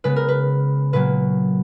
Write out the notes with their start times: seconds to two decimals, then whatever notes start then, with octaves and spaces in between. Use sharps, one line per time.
0.04 C#3 G#3 B3 B4
0.16 A#4
0.28 B4
0.93 A#2 F#3 A#3 B4